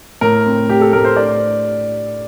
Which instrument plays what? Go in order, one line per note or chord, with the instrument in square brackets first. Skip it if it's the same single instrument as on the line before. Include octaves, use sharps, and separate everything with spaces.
[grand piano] A2 A#4
C4
A2 G4
A4
A2 A#4
C5
D4 D5